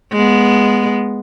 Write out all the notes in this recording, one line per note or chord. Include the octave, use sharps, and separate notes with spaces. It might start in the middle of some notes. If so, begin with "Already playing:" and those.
G#3 B3